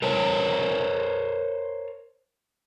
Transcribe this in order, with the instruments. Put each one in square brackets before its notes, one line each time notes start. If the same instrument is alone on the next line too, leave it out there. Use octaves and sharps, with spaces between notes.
[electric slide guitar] A#4 C5 C#5 A5